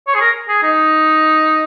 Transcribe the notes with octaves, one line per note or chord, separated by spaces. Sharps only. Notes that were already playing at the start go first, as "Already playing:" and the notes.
C#5
G#4
A#4
G#4
D#4